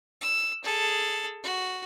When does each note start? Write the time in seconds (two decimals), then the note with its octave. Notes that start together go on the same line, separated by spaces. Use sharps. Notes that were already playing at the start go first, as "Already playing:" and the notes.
0.21 E6
0.64 G#4 A4
1.44 F#4